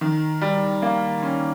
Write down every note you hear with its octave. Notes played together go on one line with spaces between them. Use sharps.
D#3
G3
A#3
C#4